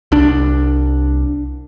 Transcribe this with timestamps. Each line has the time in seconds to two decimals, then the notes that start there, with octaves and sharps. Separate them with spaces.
0.12 C2 D4